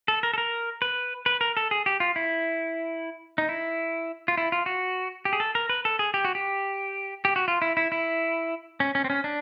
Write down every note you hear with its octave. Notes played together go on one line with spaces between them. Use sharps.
A4
A#4
A4
A#4
B4
B4
A#4
A4
G#4
G4
F4
E4
D#4
E4
F4
E4
F4
F#4
G4
G#4
A4
A#4
B4
A4
G#4
G4
F#4
G4
G4
F#4
F4
E4
E4
E4
C#4
C#4
C4
C#4
D4